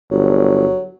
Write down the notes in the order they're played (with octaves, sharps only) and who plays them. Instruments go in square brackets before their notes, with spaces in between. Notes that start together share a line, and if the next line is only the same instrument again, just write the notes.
[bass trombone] G1 [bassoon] F#3